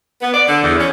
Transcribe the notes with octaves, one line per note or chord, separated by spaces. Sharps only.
B3
D5
D3
E2
C#4